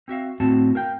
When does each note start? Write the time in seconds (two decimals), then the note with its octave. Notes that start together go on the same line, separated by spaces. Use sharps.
0.08 C4 F#4 E5 F5
0.40 A2 C4 F#4 A5
0.75 A#4 F5 G5